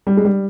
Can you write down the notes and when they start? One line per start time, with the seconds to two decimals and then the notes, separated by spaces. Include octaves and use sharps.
0.07 G3
0.17 G#3
0.25 G3